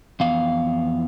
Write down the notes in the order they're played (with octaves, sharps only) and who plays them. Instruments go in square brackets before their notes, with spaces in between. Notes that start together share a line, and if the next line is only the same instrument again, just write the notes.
[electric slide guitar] F2 E3 B3 F5